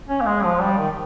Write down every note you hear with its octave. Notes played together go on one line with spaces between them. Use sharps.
C#4
A#3
G#3
F3
G3
D#3